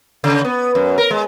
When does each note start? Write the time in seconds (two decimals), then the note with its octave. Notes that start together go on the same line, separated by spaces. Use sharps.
0.24 C#3
0.45 B3
0.75 F#2
0.98 A#4
1.11 G#3